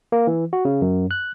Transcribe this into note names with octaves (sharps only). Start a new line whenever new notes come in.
A#3
E3
F#4
C#3
F#2
F#6